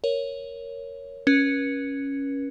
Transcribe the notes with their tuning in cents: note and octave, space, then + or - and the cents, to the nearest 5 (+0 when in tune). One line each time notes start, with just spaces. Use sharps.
A#4 +0 C#5 +0
C#4 +0 B4 -45